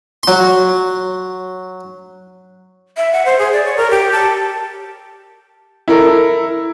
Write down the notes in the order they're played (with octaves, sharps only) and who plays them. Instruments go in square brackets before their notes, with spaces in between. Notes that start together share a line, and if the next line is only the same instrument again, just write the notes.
[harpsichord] F#3 C6
[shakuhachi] E5
F#5
C5
G#4
D5
C#5
A#4
G4
A5
[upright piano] E4 A4 A#4